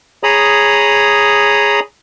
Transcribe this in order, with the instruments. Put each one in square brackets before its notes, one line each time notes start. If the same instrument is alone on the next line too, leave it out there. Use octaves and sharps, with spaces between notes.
[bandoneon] G#4 C#5 A#5 B5 D#6